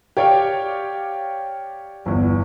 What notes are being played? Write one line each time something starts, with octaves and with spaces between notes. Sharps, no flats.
G4 C#5 D5 F5 G5
G1 E2